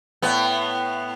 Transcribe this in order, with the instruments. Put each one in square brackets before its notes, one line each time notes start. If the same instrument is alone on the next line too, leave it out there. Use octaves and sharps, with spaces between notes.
[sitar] A2 B3